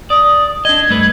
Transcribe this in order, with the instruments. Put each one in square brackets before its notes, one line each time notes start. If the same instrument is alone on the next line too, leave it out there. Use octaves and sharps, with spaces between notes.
[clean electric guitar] D5 [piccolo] D#6
[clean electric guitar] D4 D#5 [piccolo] G#6
[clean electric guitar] G2 A3 B4